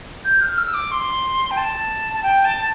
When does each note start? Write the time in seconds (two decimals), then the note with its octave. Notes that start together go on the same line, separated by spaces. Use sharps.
0.25 G6
0.42 F6
0.58 E6
0.74 D6
0.92 C6
1.51 G5
1.57 A5
2.14 A5
2.23 G5
2.45 A5